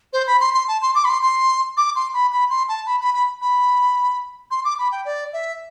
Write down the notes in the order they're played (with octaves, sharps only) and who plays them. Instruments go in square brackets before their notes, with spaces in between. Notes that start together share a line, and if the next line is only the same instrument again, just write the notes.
[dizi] C5
B5
C6
C6
A5
C6
D6
B5
C6
C6
D6
C6
B5
B5
C6
A5
B5
B5
B5
B5
C6
D6
B5
G5
D5
E5